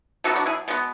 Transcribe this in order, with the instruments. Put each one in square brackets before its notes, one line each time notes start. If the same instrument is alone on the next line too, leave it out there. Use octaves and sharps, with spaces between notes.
[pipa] B2 F#3 B3 F#4 A4
D4 F#4
E4 G#4
B2 G#3 B3